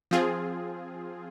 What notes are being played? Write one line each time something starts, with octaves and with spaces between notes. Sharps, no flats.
F3 C4 F4 G#4